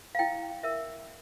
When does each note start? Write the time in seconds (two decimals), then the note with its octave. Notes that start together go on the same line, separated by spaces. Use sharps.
0.15 F5
0.19 E4 G5
0.63 A#4 E5